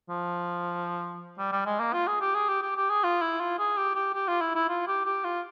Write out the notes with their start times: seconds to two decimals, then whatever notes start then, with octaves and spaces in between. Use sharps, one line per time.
0.09 F3
1.38 G3
1.52 G3
1.66 G#3
1.79 A#3
1.93 F4
2.07 G#4
2.21 G4
2.35 G#4
2.49 G4
2.62 G4
2.76 G4
2.90 G#4
3.04 F4
3.22 E4
3.40 F4
3.59 G#4
3.77 G4
3.95 G4
4.14 G4
4.28 F4
4.41 E4
4.55 E4
4.69 F4
4.88 G4
5.05 G4
5.24 F4